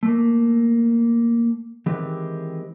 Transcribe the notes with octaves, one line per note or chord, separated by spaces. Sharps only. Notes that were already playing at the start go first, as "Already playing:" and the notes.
A3 A#3
D#3 E3 G#3 C4 G4 B4